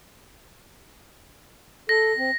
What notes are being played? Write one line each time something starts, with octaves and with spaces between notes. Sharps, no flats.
A4 A#6
C4